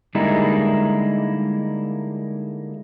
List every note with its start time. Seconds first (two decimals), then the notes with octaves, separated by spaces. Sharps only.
0.15 D3 G3 G#3 A#3 D#4 E4